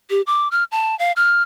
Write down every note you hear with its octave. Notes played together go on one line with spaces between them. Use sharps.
G4
D6
F6
A5
F5
F6